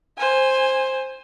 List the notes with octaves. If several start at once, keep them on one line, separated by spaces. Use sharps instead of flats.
C5 G#5